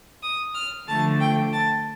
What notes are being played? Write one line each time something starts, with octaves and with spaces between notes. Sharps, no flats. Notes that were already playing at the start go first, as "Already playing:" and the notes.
D#6
F6
D3 F3 A3 A5
G5
A5